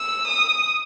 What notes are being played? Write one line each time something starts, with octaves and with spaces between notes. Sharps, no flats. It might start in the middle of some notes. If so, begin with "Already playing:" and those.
Already playing: E6
D#6